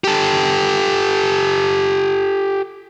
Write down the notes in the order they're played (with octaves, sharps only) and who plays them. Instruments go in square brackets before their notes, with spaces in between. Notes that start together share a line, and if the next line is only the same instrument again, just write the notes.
[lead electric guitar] G4 A4